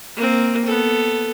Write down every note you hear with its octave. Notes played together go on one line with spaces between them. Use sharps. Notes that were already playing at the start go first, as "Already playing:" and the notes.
A#3 C4
B3 A4